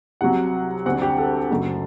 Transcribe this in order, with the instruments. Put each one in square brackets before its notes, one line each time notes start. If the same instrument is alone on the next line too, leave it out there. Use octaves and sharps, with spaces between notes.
[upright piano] C2 C3 F#3 F#5
D2 D3 G3 C4 F#5
G4
A4
F#1 F#2 F#3 A3